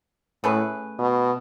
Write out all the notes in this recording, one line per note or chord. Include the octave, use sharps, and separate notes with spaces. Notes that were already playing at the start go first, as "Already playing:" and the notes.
A2 A3 C#4 G#4 B4
B2